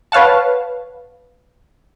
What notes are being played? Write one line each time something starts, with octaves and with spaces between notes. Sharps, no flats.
B4 C#5 F5 F#5 A5